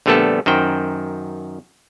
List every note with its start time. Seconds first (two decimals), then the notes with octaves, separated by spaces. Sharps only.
0.06 A#1 D3 G3 A3 B3 A4
0.46 F#2 D#3 C5 G5